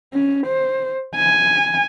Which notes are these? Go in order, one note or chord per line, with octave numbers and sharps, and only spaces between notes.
C#4
C5
G#5